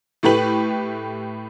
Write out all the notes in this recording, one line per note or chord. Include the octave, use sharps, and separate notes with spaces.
A2 A3 G4 B4 F#7